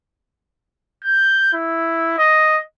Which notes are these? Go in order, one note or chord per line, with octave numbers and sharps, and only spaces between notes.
G6
E4
D#5